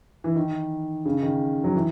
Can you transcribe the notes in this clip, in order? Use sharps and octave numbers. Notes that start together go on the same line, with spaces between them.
E3
D#3
C#3
D#3
F#3
E3